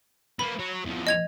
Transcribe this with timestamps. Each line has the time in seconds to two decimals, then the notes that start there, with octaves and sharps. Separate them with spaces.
0.39 A#3 B3 B5
0.59 F#4 C#5
0.85 E2 F3
1.07 D#5 G#6 F7